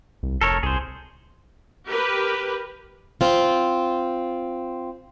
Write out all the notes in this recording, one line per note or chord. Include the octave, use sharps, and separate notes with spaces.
C2
F1 A4 A#4 C#5
C2 G#4 C5
G4 A#4 B4
C4 F4